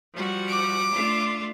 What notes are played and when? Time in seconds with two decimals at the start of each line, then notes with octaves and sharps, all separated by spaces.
0.14 F3 G3 F#4
0.49 D6
0.92 A3 D4 F4